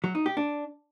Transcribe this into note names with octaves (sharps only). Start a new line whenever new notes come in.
F#3
D#4
G4
D4